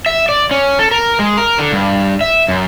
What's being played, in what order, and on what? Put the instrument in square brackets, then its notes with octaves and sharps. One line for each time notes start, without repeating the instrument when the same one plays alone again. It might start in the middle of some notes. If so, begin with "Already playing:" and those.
[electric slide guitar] E5
D5
C#4
A4
A#4
G#3
A#4
D3
G2
E5
F#2